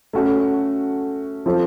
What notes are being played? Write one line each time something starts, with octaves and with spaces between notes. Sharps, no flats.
A3 C#4 F#4
F3 C4 F4 A4 C5